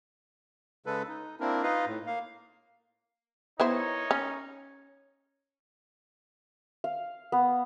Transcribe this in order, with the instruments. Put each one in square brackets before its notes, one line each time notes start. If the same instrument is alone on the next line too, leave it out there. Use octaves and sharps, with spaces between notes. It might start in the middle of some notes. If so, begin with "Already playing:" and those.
[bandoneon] C#3 G#3 A4 B4
D#4
A#3 C4 D4 E4 A#4
D#4 F4 B4 D#5 F5
A2
A#3 F5
[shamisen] B3 E4 C5 [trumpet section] D#4 A#4 C#5
[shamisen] C#4
[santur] F5
B3